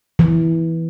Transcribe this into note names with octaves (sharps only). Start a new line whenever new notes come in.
E3